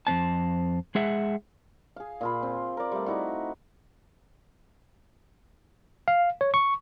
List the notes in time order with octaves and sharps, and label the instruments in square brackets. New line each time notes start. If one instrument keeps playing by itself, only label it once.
[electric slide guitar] F2 G#2 C4 A5
G#3 G#4 E5 F#5
[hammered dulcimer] G#4 F5
A#2 F4 B5
C4
A#4 D5
G3 A3
D#4 E4 F#4
[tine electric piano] F5
C#5
C#6